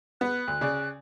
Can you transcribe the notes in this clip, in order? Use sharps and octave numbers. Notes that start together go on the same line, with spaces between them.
B3 F#6
D2
C#3 D5